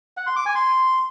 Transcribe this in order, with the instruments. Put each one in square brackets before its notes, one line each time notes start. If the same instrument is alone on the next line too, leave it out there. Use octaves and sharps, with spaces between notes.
[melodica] F#5
C6
D6
G#5
C6